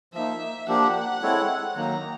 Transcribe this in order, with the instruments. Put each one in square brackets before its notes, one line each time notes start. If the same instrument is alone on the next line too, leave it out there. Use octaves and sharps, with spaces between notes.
[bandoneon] F3 A#3 D#4 [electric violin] E5
[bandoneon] F3 A#3 D4 G4 [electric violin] F#5
[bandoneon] G#3 C4 E4 A4 C#5
[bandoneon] D#3 F#3 A#3 D#4 [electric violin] A#5